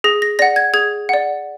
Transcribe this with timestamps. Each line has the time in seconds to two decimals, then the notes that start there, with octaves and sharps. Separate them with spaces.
0.04 G#4 A#6
0.22 A#6
0.39 D5 F#5 A#6
0.56 G#6
0.74 G#4 G#6
1.09 D5 F#5